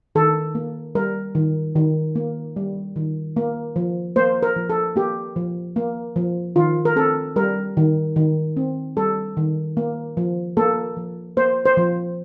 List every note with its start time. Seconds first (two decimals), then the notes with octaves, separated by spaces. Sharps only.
0.15 D#3 A4
0.55 A#3
0.95 G3 A#4
1.35 D#3
1.76 D#3
2.15 A#3
2.56 G3
2.96 D#3
3.36 A#3
3.76 F3
4.16 A#3 C5
4.42 A#4
4.56 F3
4.70 A4
4.96 A#3 G4
5.36 F3
5.76 A#3
6.16 F3
6.56 D#3 F4
6.85 A#4
6.96 C4 A4
7.36 G3 A#4
7.77 D#3
8.16 D#3
8.57 C4
8.97 G3 A4
9.37 D#3
9.77 A#3
10.17 F3
10.57 A#3 A4
10.97 F3
11.37 A#3 C5
11.65 C5
11.77 F3